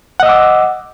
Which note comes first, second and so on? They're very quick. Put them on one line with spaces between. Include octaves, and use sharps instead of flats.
F#5 D#5 E6 D6